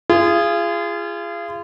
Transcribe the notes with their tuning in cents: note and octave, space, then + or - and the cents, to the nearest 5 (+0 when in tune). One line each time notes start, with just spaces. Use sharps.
F4 -35 G#4 -15